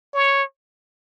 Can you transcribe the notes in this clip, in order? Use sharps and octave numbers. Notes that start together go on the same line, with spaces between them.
C#5